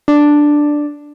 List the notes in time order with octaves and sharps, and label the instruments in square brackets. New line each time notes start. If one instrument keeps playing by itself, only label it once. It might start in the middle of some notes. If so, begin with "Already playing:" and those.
[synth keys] D4